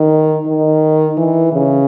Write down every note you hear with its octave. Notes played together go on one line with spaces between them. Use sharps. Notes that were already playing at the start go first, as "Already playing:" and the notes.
Already playing: D#3
D#3
E3
C#3